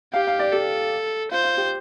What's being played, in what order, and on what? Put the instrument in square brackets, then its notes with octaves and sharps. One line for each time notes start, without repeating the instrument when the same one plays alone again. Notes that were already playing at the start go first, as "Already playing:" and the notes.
[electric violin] G4 [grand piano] F5
[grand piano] F5
D5
[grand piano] G4 [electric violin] A4
[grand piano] F4 [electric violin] C5
[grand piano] F4
G4